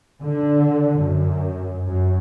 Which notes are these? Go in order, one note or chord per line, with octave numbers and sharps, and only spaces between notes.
D3
F#2
F#2